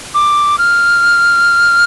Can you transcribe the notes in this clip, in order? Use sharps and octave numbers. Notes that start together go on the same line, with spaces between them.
D6
F6